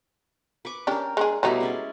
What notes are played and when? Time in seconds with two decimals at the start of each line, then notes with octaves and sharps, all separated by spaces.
0.65 B4 C#6 D6
0.87 C#4 D4 G4 A#4 G5
1.17 G#3 D4 G#4
1.43 B2 F#3 G3 A3 D#4 E4
1.61 G#3 C#4 D5